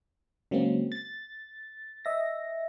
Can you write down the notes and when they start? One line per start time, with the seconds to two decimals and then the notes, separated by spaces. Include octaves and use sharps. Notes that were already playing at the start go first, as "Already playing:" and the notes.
0.51 C#3 F#3 G#3 A#3 C4
0.92 A6
2.05 D#5 E5 A#6